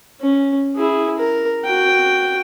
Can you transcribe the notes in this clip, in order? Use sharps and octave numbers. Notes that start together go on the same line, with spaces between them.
C#4
E4 G#4
A#4
F#4 G5